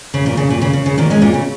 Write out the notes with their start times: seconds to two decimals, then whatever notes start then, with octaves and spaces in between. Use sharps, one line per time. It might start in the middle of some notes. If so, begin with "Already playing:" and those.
0.14 C#3
0.26 A#2
0.37 C#3
0.50 A#2
0.61 C#3
0.73 C#3
0.86 C#3
0.98 A#2 D#3
1.10 G#3 C#4
1.22 A#2
1.34 C#3